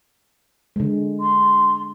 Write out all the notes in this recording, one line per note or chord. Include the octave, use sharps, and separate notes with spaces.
D3 G#3
C6